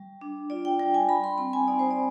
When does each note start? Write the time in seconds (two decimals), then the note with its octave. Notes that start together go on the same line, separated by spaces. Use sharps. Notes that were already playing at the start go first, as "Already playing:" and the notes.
Already playing: G3
0.21 D4
0.50 F4 D5
0.65 G5
0.79 G3 G5
0.94 G#5
1.09 G3 B5
1.24 C6
1.38 C4 B5
1.53 G#5
1.68 D#4 D5
1.79 C5
1.91 D5